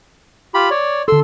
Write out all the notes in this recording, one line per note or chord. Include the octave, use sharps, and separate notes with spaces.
F4 G4 B5
C#5 D5
D3 A4 C6 E6